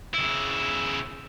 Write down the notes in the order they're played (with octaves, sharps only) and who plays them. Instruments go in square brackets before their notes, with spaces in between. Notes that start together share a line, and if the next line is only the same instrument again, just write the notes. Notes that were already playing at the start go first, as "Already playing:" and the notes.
[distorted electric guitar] C#3 E4